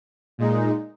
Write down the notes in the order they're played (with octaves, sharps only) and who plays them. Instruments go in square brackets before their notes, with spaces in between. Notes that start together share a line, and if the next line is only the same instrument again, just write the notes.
[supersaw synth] A#2 G#3 D#4